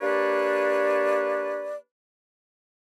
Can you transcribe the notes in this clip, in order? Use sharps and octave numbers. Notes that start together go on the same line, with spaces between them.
A#3 D4 G4 B4 C#5 D5